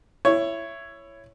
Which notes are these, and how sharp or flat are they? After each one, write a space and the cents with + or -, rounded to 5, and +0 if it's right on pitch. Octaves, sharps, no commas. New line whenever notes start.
E4 +20 C#5 +0